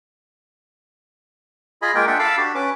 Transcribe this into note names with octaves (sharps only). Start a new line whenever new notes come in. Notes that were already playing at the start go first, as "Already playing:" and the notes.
F4 G#4 D#5 G#5 B5
G#3 A#3 F4 A#4 G5
D4 F4 E5 F#5 G5
A4 F5 A5 B5 D6 E6
D4 F#4 G4
C#4 B4 D6